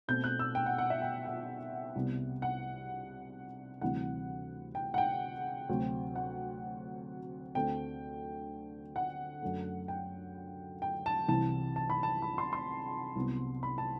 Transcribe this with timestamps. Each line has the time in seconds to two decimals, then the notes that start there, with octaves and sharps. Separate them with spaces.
0.08 B2 A3 C4 G6
0.24 F#6
0.39 E6
0.55 G5
0.66 F#5
0.78 F#5
0.90 E5
1.02 G5
1.26 F#5
1.95 C2 C3 G3 B3
2.42 F#5
3.81 D2 C3 E3 G3 C4 F#5
4.75 G5
4.94 F#5
4.98 G5
5.69 D2 C3 F#3 C4
6.16 F#5
7.55 D2 D3 A3 C4 G5
8.96 F#5
9.42 F#2 D3 A3
9.88 G5
10.82 G5
11.06 A5
11.28 C2 C3 E3 A5
11.76 A5
11.90 B5
12.03 A5
12.22 B5
12.38 C6
12.53 C6
13.15 C2 C3 F#3 B3
13.63 B5
13.78 A5